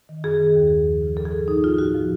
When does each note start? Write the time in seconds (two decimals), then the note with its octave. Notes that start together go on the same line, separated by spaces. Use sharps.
0.09 D#3
0.24 F#2 G#4
0.40 D#3
0.55 D#2
0.71 C#3 F3
0.86 D#2
1.02 C#3 F3
1.17 G#2 A4
1.25 G#4
1.32 F3 A4
1.48 G#2 D#4
1.63 F3 F4
1.78 A2 F#4
1.94 F3